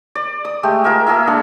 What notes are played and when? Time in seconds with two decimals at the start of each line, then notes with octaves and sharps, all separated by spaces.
0.15 D5
0.45 D#6
0.63 G#3 A3 G4
0.84 F4 G#4 A#4 E5
1.07 A#3 G#4 A4 E5
1.27 G#3 D4 F4 A4